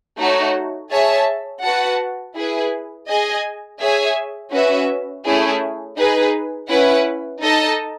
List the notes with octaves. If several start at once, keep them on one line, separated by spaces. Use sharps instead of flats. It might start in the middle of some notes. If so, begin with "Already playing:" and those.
A3 D#4 F#4 C#5
G#4 C#5 E5 A5
F#4 B4 F#5 A5
E4 G#4 B4
G#4 D#5 G#5
G#4 C#5 E5 G#5
C#4 F#4 B4 E5
A3 C#4 E4 G#4
D#4 G#4 B4
C#4 E4 B4 F#5
D#4 A4 D#5 A5